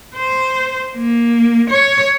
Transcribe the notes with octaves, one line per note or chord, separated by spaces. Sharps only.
C5
A#3
C#5